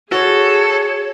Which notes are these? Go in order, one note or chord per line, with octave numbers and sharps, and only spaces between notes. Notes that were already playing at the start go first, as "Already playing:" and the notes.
F#4 G#4 A4 C#5